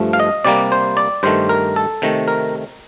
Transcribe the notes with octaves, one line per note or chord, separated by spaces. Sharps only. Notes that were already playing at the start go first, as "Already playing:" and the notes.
Already playing: G2 F3 A3
F5
D#5
C3 G3 A#3 D5
C5
D5
G2 D#3 A3 C5
A#4
A4
C3 D#3 A3
A#4